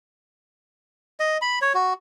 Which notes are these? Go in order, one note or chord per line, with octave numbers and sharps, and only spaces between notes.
D#5
B5
C#5
F#4